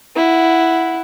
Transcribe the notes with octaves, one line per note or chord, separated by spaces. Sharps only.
E4 F#5